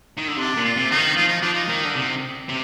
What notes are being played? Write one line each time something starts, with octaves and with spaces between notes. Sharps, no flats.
D#3
D3
C3 D4
A#2
F4
C3
D3 D#4
D#3
F3 F4
D#4
F3 D4
D#4
D#3
D3
C3
C3